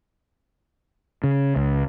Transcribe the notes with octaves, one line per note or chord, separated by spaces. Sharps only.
C#3
C#2